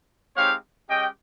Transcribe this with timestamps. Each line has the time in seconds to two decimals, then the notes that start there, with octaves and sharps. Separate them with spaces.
0.36 G#3 C4 D#4 G4 C#5 F5
0.88 G#3 C#4 G4 D#5 G5